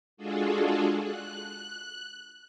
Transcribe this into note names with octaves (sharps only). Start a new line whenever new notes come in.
G#3 D4 F4 F#4 G#4 A4
F#6